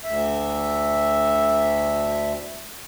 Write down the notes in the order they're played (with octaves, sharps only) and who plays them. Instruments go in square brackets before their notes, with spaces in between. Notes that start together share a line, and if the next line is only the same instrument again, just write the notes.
[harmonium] D2 E5